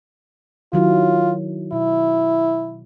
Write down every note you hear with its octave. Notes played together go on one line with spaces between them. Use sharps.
D#3 F#3 E4 F4
B2 E4